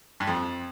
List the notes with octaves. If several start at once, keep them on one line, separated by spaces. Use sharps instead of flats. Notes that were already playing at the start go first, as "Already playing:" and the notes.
G2
F2